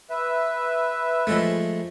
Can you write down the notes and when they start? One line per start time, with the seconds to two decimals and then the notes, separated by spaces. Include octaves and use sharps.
0.10 B4 E5
1.27 F3 G#3 A3